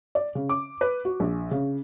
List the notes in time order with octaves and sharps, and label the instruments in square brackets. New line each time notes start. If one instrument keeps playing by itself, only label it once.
[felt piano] D5
C#3
D6
B4
F#4
A#1
C#3